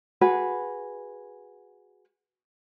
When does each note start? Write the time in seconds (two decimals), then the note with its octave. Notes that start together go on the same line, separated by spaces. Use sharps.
0.21 F#4 G#4 B4